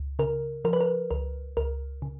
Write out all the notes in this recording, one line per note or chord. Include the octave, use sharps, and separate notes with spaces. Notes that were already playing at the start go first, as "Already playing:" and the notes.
Already playing: C#2
C#3 A#4
F3 A#4
B4
A#4
C#2 A#4
C#2 A#4
C#3